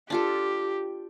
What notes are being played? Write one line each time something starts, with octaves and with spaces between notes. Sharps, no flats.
D4 F4 G4 A4